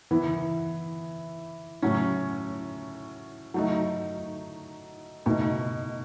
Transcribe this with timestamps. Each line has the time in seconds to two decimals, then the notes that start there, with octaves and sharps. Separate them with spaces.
0.11 E3 B3 E4
1.82 A2 F#3 C#4
3.54 F#3 A3 D#4
5.26 B2 A3 D#4